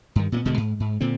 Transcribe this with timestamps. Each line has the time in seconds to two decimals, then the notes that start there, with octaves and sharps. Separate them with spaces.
0.16 G2 D#3
0.32 A#2 A3 B3
0.45 D#1 B2 D3 G#3
0.57 G#2
0.80 G#2
1.01 A#2 D3 C4